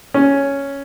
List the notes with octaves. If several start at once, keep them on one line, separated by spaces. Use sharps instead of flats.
C#4